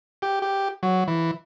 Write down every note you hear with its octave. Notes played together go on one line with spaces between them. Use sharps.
G4
G4
F#3
E3